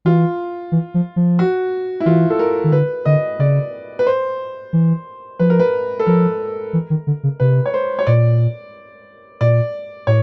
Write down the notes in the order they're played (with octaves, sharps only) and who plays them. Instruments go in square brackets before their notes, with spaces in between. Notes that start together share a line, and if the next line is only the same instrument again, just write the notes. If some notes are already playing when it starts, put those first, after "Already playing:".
[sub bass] E3 [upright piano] F4
[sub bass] E3
F3
F3
[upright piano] F#4
E4
[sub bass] E3 [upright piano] F4
[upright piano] A4
A#4
[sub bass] D#3
[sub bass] D3 [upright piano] B4
[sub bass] D3 [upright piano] D#5
[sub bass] C#3 [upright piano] D5
[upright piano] B4
C5
[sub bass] E3
[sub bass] F3 [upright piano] B4
[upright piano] A#4
B4
A4
[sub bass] F3 [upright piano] A#4
[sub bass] E3
D#3
D3
C#3
[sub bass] C3 [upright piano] B4
[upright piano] C#5
C5
C#5
[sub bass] A#2 [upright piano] D5
[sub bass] A#2 [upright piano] D5
[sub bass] A2 [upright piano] C#5